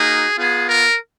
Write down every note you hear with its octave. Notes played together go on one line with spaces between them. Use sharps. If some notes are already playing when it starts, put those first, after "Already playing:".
Already playing: A#3 D#4 F#4 G#4
B3 F4 G#4
A#4